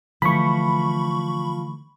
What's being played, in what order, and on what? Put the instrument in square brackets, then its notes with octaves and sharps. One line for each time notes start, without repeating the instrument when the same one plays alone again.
[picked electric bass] D3 E3 A3 [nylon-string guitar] F3 [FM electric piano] B5 C#6